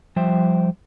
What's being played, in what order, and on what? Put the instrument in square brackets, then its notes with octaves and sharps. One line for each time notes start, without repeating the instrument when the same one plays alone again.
[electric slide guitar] F3 G3 C5 E5 G5